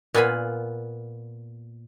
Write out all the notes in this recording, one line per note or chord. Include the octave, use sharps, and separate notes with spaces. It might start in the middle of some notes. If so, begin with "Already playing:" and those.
A#2 B3 F4 G#5 B5